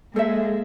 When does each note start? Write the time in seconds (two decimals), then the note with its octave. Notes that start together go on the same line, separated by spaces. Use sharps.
0.16 G#3 A#3 A4 C5 E5